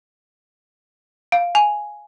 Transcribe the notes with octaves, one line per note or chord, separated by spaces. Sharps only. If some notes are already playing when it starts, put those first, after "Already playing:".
F5
G#5